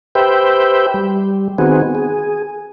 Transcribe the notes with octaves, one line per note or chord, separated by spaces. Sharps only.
G4 B4 C5 E5 G5
G3
D#3 B3 C4 F#4 G#4
G#4